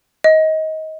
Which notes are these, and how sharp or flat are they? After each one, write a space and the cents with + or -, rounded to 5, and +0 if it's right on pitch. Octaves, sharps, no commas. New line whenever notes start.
D#5 +20